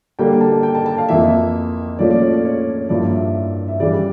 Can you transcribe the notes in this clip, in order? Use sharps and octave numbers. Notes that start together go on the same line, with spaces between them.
D3 G3 A#3 G5
A5
G5
A5
A5
F5
F2 E3 A#3 E5
A#2 F3 A3 C#4 D5
D5
C#5
D5
C#5
G2 F3 A#3 E4 D5
E5
E5
C#3 E3 G3 D5